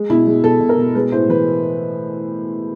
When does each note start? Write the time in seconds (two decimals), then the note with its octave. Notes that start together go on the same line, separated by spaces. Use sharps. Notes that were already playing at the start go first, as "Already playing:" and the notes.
Already playing: G#3
0.10 B2 E4
0.27 G#3
0.44 B2 A4
0.60 B2
0.69 A#4
0.78 B2
0.95 G#3 B4
1.12 A2 C5
1.29 E3 B4